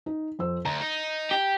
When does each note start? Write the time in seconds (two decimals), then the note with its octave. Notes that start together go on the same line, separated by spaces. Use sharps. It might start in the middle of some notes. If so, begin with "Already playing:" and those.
0.06 D#4
0.39 F2 C5 E6
0.65 D2 A#5
0.81 D#4
1.31 G4